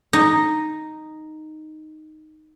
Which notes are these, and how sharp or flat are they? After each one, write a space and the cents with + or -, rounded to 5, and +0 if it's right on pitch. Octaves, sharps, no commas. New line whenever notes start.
D#4 -5